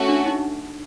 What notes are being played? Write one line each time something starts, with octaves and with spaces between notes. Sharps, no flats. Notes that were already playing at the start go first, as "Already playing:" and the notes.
Already playing: A3 C#4 F#4
D4
D#4